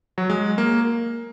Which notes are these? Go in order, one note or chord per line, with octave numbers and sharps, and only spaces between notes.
F#3
G#3
A#3